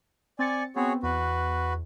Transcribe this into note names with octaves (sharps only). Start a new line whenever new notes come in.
C4 D5 G#5 A6 C#7
B3 C4 F#4 G#4 C#5
E2 F#4 B4